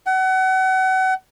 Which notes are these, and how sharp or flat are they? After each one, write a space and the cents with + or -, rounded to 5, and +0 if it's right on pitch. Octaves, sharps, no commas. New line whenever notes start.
F#5 +30